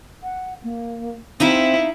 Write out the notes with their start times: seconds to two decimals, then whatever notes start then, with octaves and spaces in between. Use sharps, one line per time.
0.23 F#5
0.63 A#3
1.40 C4 D#4 E4 E5 F5